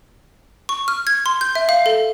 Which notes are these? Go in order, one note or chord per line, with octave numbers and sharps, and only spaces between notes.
C#6
F6
G#6
C6
G6
E5
F5
A4